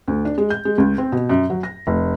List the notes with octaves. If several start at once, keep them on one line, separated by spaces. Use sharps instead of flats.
D2
D4
G#3
G6
G#3
C#2
C4
B2
F#2
F#3
A#6
F1